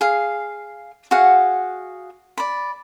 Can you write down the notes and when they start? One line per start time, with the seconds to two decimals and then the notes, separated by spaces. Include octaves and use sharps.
0.01 G#4 F5
1.11 F#4 G#4 F5 F#5
2.38 D5 B5